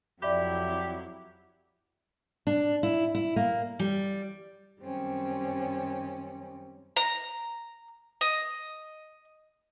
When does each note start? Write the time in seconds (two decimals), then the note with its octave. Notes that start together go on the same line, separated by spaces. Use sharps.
0.22 F2 F#3 E4 G4 D5 E5 B5
2.47 D4
2.83 E4
3.15 E4
3.36 A#3
3.79 G3
4.80 F#2 D#3 G3 C4 C#4
6.97 A#5
8.21 D#5